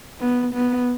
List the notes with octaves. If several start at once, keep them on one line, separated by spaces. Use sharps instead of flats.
B3
B3